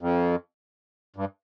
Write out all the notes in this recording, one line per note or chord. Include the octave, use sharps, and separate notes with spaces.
F2
G2